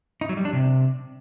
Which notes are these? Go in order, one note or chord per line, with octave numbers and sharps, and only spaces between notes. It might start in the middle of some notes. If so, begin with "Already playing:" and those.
D#4
F#3
G3
D4
C3